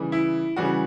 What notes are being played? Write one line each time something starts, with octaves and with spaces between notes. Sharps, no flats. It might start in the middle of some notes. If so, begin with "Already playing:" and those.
Already playing: C#3 E3 G3
E4
C#3 E3 G3 F#4